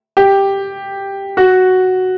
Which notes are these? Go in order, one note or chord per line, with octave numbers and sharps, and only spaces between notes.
G4
F#4